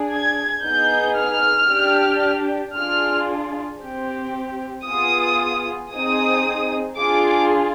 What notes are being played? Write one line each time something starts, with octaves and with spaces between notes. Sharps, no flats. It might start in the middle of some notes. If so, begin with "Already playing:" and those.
Already playing: D4 G#4
G#6
B3 D#4 G#4 G6
F6
D4 G4
D4 F4 G#4 F6
C4 G4
B3 F4 G#4 D#6
C4 D#4 G#4 D#6
D4 F4 G#4 D6